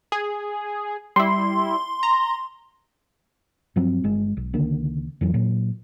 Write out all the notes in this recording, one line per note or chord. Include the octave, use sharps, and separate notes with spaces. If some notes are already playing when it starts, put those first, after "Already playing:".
G#4
G3 E4 C6
A#5
G2 F3 F#3 C4
G1 G#3
B1
C#2 D3 D#3 A#3
F2 E3 F#3
A#2 F#3